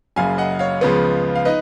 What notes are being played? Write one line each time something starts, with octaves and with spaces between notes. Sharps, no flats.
F#1 F#2 C#3 F5 G#5
D#5 F#5
C#5 F5
C#2 C#3 F3 G#3 B3
F5
D#4 B4 D#5